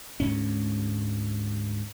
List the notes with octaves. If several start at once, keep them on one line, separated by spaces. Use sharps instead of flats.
D2 G#2 C#4